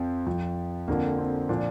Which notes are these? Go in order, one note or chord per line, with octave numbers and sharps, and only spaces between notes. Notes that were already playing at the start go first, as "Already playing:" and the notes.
Already playing: F2 F3 C4
F2 F3
F2 D3 F3 A#3
C4
A#2 F3 D4